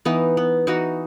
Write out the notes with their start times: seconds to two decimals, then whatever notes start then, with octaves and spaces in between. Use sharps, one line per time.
0.05 E3 B3 D#4
0.37 B3
0.67 E3 D#4 F#4